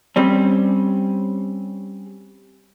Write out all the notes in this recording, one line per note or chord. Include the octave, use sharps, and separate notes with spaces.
G3 C4 C#4